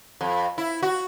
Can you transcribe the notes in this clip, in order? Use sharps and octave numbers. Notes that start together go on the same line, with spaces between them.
F2
E4
F#4